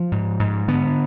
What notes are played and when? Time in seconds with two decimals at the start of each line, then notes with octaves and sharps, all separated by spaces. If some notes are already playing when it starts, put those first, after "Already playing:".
Already playing: F3
0.12 G#2
0.39 G#2
0.68 D3 B3